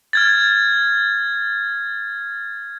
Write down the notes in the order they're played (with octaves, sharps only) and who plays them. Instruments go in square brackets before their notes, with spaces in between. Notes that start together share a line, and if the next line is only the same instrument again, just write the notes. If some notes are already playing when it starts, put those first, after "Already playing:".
[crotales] F6 G#6 A6